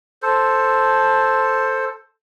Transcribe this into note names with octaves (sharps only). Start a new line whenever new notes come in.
A4 C5